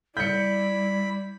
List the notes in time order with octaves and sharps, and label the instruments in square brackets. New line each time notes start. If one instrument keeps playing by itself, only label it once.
[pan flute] G3 [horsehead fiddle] E4 D5 [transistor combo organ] B5 [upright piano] G6 C#7